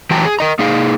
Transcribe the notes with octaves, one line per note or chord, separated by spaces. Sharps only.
E3 F#3 G4 G5 A5 A#5
G#4
A#4 D#5 A#5
A#3 D#4 G#4 F5